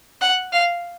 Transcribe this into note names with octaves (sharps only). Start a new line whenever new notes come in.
F#5
F5